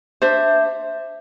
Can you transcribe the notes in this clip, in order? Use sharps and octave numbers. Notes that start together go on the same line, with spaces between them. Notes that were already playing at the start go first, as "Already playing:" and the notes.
D4 C5 E5